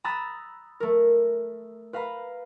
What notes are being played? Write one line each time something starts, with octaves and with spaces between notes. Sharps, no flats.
A#5 B5 D#6 E6 F#6 A6
A3 A#4
B4 F5 A#5 B5